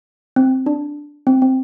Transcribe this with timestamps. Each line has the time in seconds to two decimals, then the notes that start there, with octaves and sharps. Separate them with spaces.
0.36 C4
0.66 D4
1.27 C4
1.42 C4